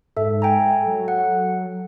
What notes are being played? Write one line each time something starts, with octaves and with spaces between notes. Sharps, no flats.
G#2 A4 E5
G5 G#5 A#5
F#3 A4
F#5